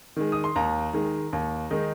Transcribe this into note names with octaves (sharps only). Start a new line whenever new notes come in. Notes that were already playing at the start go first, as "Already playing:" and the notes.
D#3 G#3
D#6
C6
D#2 A#5
D#3 G#3
D#2
D#3 G#3 D#4